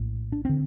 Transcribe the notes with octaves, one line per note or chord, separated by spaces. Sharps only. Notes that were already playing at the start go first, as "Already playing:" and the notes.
Already playing: A#1 A2
D4
D3 C4